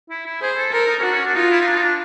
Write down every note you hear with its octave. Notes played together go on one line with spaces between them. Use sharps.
E4
E4
G#4 C5
A4
A4 A#4
D#4
C#4
D4 F#4
C#4
D4
D#4 F4
E4
D#4
D4
D#4
D4